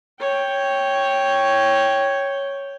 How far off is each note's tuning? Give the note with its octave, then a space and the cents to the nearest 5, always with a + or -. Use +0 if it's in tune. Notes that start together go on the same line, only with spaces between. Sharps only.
C#5 +0 G5 +0